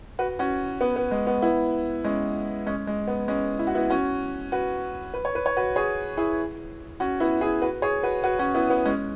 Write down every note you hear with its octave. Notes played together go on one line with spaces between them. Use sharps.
F#4 B4
C#4 F#4
B3
B3
G#3
B3
B3 E4
G#3 C#4
G#3 C#4
G#3
B3
G#3 C#4
E4
F#4
B3 E4
C#4 F#4
F#4 B4
B4
C#5
B4
C#5
F#4 B4
G#4 C#5
E4 G#4
C#4 F#4
B3 E4
E4 G#4
F#4 B4
G#4 C#5
F#4 B4
F#4 B4
C#4 F#4
B3 E4
B3
G#3 C#4